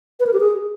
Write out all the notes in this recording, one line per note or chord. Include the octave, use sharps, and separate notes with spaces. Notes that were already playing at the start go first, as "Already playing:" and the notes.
B4
A#4
G4
G#4